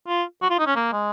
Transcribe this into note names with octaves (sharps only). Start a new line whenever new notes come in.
F4
F#4
F4
D#4
C#4
A#3
G#3